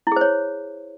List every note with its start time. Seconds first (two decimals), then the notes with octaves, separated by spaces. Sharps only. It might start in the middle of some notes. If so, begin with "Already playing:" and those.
0.07 E4
0.12 G#4
0.16 C5
0.21 C#5